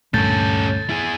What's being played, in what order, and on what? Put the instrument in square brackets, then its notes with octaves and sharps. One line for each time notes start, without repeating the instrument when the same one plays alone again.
[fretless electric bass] D2 A#2 A3 [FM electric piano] G2 G6 [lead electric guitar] C#4 A4 [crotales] A6
[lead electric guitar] E4 G#4